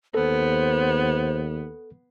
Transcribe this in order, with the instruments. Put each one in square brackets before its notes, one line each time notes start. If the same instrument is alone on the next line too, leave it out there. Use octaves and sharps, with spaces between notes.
[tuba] D#2 [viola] B3 [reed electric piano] A4 [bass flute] C5